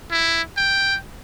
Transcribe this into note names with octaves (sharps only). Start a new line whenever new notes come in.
E4
G5